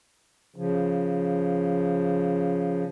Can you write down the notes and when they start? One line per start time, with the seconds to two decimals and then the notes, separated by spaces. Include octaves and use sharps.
0.56 C#3 F3